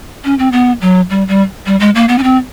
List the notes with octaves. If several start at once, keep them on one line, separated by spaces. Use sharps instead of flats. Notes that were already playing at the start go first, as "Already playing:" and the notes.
C#4
C4
B3
F#3
G3
G3
G3
G#3
A#3
B3
C#4
C4